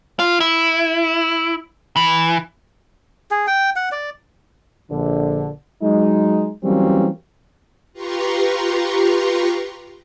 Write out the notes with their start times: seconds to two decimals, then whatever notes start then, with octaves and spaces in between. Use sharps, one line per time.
0.19 F4
0.40 E4
1.96 E3
3.31 G#4
3.47 G5
3.76 F#5
3.92 D5
4.90 A#1 D3
5.82 F#3 G#3 D#4
6.64 E3 F#3 G3 A#3 C4 C#4
7.93 F4 G4 B4 A#5 C6 C#6